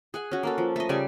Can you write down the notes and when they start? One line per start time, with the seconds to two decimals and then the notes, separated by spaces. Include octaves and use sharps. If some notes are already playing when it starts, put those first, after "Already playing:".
0.14 G#4 F#5 G#5
0.32 C#4 F#4
0.43 A#3 F#4 A4
0.58 F3
0.76 A3 D#5
0.89 C#3 G3 D5 G#5